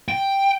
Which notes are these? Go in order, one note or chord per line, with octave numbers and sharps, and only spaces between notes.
G5